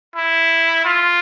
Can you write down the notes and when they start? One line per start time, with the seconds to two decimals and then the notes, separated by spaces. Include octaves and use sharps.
0.16 E4
0.85 F4